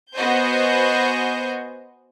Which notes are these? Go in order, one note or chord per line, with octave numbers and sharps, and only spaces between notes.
B3 F#4 C5 D#5 G#5 G6